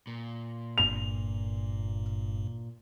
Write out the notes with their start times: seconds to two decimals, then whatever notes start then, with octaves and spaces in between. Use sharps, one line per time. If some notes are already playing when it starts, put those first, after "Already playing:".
0.07 A#2
0.78 G1 G2 F7